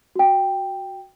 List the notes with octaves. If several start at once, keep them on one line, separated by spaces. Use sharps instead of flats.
F#4 G5